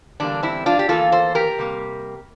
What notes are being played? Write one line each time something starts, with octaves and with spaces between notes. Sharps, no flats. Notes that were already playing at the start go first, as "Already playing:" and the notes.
E2 D3 G3 A#3 D4
C4 E4
D4 F4
G4
E2 E3 A#3 F4 A4
A4 C5
G4 A#4
C3 G3 A#3